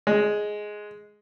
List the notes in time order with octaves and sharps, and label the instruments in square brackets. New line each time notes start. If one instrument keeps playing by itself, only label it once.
[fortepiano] G#3